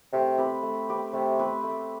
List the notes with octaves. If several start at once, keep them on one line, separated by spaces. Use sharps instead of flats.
C3 A3
C4 G4 B4
A3
C4 G4 B4
C3 A3
C4 G4 B4
A3